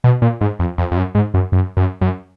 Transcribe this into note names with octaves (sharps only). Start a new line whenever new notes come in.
B2
A#2
G#2
F2
F2
F2
F#2
G#2
F#2
F#2
F#2
F#2